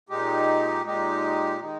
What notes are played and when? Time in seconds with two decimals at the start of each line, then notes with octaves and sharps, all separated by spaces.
0.09 A#2 G#3 D#4 G4
0.85 A#2 G#3 D#4 G4
1.60 D#3 G#3 D#4